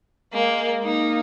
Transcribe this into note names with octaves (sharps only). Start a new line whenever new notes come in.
G#3 A#3
A#3 D#4